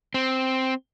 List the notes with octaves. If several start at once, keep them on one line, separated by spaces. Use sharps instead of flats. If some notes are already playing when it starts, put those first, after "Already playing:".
C4